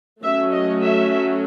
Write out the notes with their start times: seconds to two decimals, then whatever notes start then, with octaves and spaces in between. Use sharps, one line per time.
0.23 F#3 A3 C#4 E5
0.52 D#5
0.81 E5